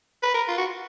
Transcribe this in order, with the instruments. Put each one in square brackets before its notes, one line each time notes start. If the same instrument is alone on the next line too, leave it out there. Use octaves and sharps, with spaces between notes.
[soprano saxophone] B4
A#4
F4
F#4